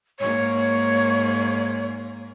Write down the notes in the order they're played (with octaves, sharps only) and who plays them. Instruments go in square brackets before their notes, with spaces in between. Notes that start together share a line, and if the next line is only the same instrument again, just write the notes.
[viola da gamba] G#2 A#3 [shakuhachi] C#5